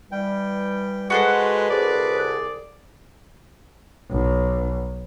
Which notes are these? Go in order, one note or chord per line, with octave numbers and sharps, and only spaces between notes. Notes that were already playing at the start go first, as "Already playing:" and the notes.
E3 G3 G5
G#3 F#4 A4 B4 C5
C2 C3 G#4 D5
B1